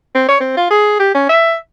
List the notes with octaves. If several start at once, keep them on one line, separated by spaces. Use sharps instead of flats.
C4
C#5
C4
F4
G#4
G4
C#4
E5